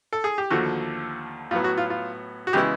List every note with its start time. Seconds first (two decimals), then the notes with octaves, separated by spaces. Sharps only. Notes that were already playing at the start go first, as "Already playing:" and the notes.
0.13 A4
0.24 G#4
0.38 G4
0.50 D#2 D3 F3 A3 F#4
1.51 A2 F#3 B3 F4
1.64 F#4
1.78 F4
1.90 F4
2.47 F#4
2.53 C#3 E3 G#3 B3 E4 G4